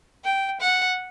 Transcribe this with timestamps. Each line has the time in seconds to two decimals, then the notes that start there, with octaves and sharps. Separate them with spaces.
0.24 G5
0.60 F#5